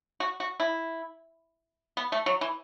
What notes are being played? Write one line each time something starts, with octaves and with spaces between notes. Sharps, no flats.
F#4
F#4
E4
B3
A3
F#3
E3